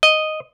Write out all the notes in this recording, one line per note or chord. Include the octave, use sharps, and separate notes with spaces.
D#5